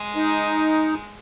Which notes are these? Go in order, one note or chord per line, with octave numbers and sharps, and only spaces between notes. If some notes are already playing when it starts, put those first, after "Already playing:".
Already playing: G#3
D#4